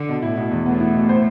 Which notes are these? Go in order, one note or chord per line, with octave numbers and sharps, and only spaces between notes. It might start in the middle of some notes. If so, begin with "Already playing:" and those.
Already playing: D3
B2
A2 E4
B2
E2
A2 B3
E4
B2
C5